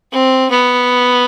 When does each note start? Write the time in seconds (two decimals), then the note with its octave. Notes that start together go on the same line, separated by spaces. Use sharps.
0.12 C4
0.51 B3